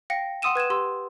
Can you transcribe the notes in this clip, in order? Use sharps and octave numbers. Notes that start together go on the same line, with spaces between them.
F5 G5 A#6 C#7
F#5 C6 D#6 E6 D#7 E7
B4 G#6 D#7 E7
G4 C6 E6